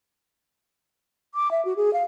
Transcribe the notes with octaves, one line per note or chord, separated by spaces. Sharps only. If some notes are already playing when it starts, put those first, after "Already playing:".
D6
E5
F#4
G#4
F5